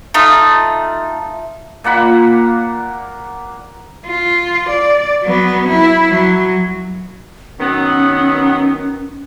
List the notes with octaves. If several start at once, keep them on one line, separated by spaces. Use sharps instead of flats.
A3 D#4 F4
A#2 A#3 F#5 B5
F4
D5
F#3 B3
E4
F#3
D#3 F#3 B3 C#4